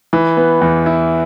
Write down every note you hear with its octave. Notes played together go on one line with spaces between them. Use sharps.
E3
B3
E2
E4